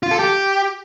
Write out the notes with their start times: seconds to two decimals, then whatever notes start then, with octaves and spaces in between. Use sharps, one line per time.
0.03 F4
0.11 A4
0.19 G4